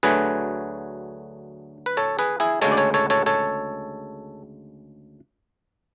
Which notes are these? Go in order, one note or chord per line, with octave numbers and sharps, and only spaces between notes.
D2 D3 F#3 A3 G#4 B4
B4
A4 C#5
G#4 B4
E4 G#4
D2 C#3 G#3 A4 C#5
D5
A4 C#5
A4 C#5
A4 C#5
A4 C#5